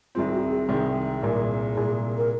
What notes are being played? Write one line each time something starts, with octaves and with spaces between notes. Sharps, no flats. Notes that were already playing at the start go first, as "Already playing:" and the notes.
C2 C3 D#3 G#3 C4 F4
F#4
G#4
C2 C3 D#3 G#3 C4 G#4
C2 A#2 G#3 A#4
C2 A#2 G#3 G#4
A#4